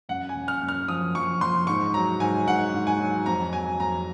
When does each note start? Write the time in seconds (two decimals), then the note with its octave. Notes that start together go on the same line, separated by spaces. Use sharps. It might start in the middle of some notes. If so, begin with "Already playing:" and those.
0.09 F#2 F#5
0.29 G#5
0.35 F#2
0.48 F6
0.62 F#2
0.68 F6
0.88 F3 D#6
1.15 F3 C#6
1.41 F3 C6
1.67 G#2 C#6
1.94 F#3 A#5
2.20 G#2 G#5
2.46 G#2 F#5
2.73 G#2
2.87 G#5
3.00 F#3
3.26 F2 A#5
3.53 F#3 G#5
3.79 F2 A#5